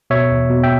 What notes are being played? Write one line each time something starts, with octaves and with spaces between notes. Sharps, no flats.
B2 C#5 E5
E2
B2
E5 G5